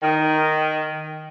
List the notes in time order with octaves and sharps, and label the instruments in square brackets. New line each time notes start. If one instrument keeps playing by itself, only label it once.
[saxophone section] D#3